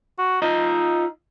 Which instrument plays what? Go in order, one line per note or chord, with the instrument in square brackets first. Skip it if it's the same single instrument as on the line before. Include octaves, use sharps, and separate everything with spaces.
[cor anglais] F#4
[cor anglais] D#4 [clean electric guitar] F4 D#5